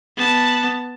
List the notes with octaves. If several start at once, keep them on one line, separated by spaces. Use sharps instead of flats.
B3 A5